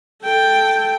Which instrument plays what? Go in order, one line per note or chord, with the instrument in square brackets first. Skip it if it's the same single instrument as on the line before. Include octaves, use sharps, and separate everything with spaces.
[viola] A4 G5